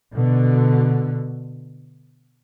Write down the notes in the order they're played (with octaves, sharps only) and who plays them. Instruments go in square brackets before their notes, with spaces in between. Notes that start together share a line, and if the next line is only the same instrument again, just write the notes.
[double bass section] B2 D3